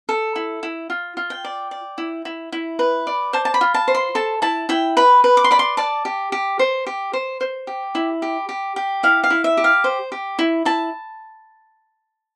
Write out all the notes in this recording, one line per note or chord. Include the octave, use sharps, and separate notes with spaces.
A4
E4
E4
F4
F4
G5
D5
D5
E4
E4
E4
B4
D5
C5 A5
A5
B5
F4
A5
C5
C6
A4 A5
E4 A5
E4 G5
B4 B5
B4
D6
C6
D5 B5
C6
D5 A5
G4
G4
C5
G4
C5
C5
G4
E4
G4
G4
G4
E4 F5
F5
E4
E5
G4
F5
C5
G4
E4
E4 A5